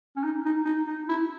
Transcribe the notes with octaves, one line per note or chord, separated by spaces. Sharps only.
C#4
D#4
D#4
D#4
D#4
E4